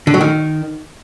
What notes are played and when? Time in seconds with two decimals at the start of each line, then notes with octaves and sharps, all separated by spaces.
0.07 D3
0.14 F#3
0.21 D#3